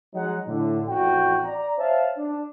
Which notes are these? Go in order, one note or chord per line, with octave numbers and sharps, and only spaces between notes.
F3 F#3 G#3 D#4 F#5
A2 D3
A1 F2 F#4 G5
D5 A#5
C5 C#5 E5 F5 A5
D4